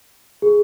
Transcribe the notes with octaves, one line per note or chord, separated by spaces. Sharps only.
G#4